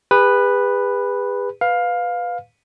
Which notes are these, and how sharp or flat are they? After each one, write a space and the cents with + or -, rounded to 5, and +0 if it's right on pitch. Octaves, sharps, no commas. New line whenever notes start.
G#4 -45 B4 +0
B4 +0 F5 +15